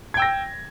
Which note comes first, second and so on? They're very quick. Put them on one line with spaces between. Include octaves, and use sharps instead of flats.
G#6 G5 E6 A#6